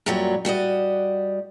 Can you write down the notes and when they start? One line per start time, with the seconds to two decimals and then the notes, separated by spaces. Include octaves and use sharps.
0.06 F#2 A#2 F#3 G3 F#4 C#5
0.45 G3 F#4 D5 D#5